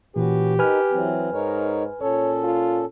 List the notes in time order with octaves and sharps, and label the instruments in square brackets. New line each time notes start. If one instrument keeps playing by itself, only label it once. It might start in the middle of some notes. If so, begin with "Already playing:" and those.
[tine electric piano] A#2 E3 [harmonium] C#4 F#4 B4 [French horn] G4
[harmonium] D#4 A#4 [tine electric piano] B4 G#5 F6
[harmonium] E3 F#3 C4
[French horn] G#2 [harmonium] D#4 A#4 C#5
[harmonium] A#2 C#4 A4 [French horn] C#5
[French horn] F4